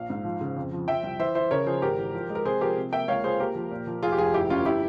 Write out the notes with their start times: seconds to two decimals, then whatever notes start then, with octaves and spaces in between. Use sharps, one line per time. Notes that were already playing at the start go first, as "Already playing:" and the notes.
Already playing: A#1 F5
0.10 G#2
0.25 F3
0.41 C#3
0.57 F2
0.72 F3
0.88 F3 E5 G5
1.03 C2
1.19 E3 C5 E5
1.35 E3 C5 E5
1.51 C#3 A#4 C#5
1.66 F3 G#4 C5
1.82 G#1 G4 A#4
1.98 E3
2.14 F3
2.30 G#3
2.35 A#4
2.45 C3 G#4 C5
2.61 F3 G4 A#4
2.77 C3
2.93 A#3 E5 G5
3.08 C#2 C#5 F5
3.24 C#2 G#4 C5
3.40 A#3 G4 A#4
3.55 F3
3.71 A#2
3.87 F3
4.02 F1 F4 G#4
4.12 G4
4.18 F1 F4 G#4
4.34 G1 E4 G4
4.50 G1 C#4 F4
4.65 E4 G4